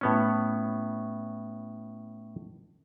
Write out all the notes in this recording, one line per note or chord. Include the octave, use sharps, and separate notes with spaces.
A2 B3 C#4